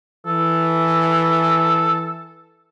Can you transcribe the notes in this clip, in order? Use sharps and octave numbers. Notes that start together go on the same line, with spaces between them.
E3 A4